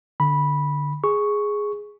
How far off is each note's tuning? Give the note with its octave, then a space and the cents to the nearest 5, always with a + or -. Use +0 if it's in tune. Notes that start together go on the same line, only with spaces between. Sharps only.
D3 +0 B5 -10
G#4 +0 C#6 +0